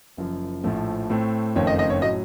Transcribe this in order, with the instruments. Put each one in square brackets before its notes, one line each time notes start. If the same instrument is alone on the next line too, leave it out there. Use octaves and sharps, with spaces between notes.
[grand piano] F#1 F#2 F3
A#1 A2 F3 A3
A2 A3 C4
F#1 F2 D#3 A3 C4 C#5
D#5
D#5
C#5
A2 F#3 D#5